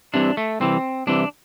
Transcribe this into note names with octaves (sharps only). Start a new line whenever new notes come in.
C2 C3 E3 D4
A3
C2 C3 E3 C4
C2 C3 E3 D4